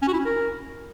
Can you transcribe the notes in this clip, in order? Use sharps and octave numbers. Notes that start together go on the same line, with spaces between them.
C#4
F#4
E4
C#4
A#4